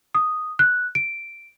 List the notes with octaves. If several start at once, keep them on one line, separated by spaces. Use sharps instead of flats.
D#6
F#6
D7